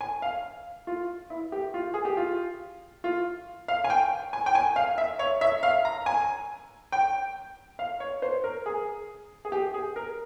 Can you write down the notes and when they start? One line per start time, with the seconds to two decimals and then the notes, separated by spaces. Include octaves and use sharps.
0.01 G#5
0.22 F5
0.87 F4
1.30 E4
1.52 G4
1.74 F4
1.94 G#4
2.05 G4
2.17 F4
3.04 F4
3.68 F5
3.84 G#5
3.90 G5
4.33 G#5
4.46 G5
4.55 G#5
4.76 F5
4.98 E5
5.19 C#5
5.41 E5
5.63 F5
5.85 A#5
6.06 G#5
6.92 G5
7.79 F5
8.00 C#5
8.22 C5
8.44 A#4
8.66 G#4
9.45 G#4
9.52 G4
9.74 G#4
9.96 A#4